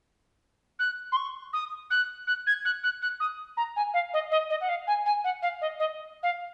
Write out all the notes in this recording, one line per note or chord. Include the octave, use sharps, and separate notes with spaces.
F#6
C6
C#6
D#6
F#6
F#6
G#6
F#6
F#6
F#6
D#6
A#5
G#5
F5
D#5
D#5
D#5
F#5
F5
G#5
G#5
F#5
F5
D#5
D#5
F5